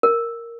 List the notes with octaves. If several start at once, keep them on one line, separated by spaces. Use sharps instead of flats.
A#4